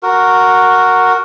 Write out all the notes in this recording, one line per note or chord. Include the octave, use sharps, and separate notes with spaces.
F#4 A#4